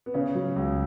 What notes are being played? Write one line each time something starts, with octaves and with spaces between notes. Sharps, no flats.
B3
C#3 C#4
F#3
C#2